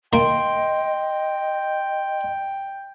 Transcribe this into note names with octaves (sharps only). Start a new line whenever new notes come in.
D#3 A#3 A#4 D#5 G5 C6 D7